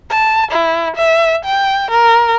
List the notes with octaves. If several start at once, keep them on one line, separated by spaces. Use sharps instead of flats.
A5
E4
E5
G5
A#4